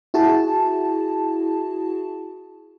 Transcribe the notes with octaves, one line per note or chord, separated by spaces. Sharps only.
E4 F#4 G#4 A5